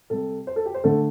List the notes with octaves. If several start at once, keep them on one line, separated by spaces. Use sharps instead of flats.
C3 G3 A4
C5
A4
G4
C5
D3 A3 A4